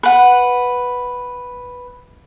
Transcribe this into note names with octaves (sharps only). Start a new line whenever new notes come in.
B4 F#5